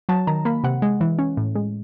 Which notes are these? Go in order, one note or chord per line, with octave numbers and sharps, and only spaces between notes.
F#3 A5
D#3 A#5
A#3 B5
C3 F#5
G#3
E3
C#4
A2
G#3